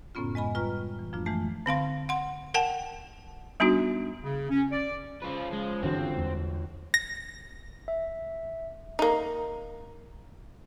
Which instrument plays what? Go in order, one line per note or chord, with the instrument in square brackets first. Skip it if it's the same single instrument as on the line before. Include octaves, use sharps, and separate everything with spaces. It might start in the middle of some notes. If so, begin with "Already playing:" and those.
[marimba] F#2 A2 C#3 B3 C#4 F4
G#3 D#5 G#5 B5
G3 F4 B4 A#5 C#6 F6
E3
F#2 F3 A3 B3 D4 F4
E3 G#3 A3 A5 G6
[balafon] D3 C4 F5 C6
F#5 C6
A#4 F#5 G5 A5
G3 B3 D4 D#4 F#4
[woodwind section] C#3
C#4
D5
[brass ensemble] C#3 F3 [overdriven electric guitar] F4 B4
[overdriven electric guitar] G#3
[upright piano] G1 D3 F#4 [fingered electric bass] G2 E3 [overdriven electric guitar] C4
[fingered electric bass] E2 G#3
[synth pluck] A#6
[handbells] E5
[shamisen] A#3 D#4